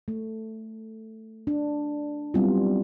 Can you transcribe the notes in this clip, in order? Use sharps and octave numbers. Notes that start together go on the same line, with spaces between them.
A3
D4
F#3 G3 B3 C4 E4 F4